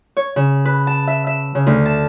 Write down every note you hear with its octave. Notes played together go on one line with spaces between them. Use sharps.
C#5
C#3
B4
A5
E5
E5
C#3
D2
A5